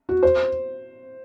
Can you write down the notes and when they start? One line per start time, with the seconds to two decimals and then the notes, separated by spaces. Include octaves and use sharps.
0.09 F#4
0.23 C5